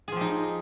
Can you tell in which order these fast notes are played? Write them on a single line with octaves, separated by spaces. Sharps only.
G#4 F3 G4 D#4